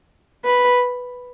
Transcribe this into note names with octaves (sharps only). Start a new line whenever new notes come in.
B4